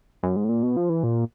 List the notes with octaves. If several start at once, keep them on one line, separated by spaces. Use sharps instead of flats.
F#2
G#2
A2
A#2
B2
F3
E3
A#2